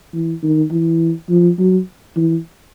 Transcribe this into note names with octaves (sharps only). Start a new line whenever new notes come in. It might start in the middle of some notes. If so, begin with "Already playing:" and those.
E3
D#3
E3
F3
F#3
E3